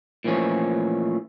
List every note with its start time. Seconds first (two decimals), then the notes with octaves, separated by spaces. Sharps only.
0.24 A#2 E3 F3 A3 C#4